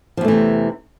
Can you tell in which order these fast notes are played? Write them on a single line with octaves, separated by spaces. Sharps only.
F3 E2 A3 E3 C3